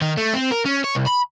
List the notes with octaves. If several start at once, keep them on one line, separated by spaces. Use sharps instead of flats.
D#3
A3
C4
A#4
C#4
C#5
C2
B5